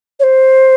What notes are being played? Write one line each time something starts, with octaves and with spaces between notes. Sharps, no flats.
C#5
C5